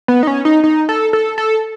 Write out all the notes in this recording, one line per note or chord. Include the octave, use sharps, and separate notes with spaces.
B3
D#4
C#4
D#4
D#4
A4
A4
A4